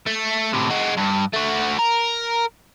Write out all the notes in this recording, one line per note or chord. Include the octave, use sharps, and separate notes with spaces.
A3
A2 C3
G#3 F#4
G2
A3 F#4
A#4